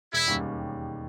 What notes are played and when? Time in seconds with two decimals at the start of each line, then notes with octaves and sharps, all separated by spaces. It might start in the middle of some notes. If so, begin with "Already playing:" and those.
0.13 E1 E4
0.28 D#2 D#3 G3 C#4